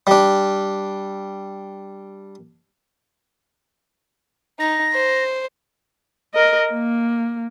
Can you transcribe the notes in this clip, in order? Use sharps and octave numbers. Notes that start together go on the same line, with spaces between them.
G3 D4
D#4 A#6
C5
A#4 D#5
A#3